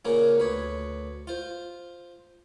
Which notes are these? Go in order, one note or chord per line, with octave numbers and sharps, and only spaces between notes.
A#2 C#3 A#3 C#4
D2 B4 C#5
F4 C5